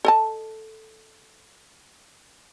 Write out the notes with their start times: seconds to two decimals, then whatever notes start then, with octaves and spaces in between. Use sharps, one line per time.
0.05 A4 D#5 A5